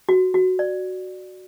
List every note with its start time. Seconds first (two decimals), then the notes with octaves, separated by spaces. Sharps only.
0.09 F#4
0.34 F#4
0.59 D5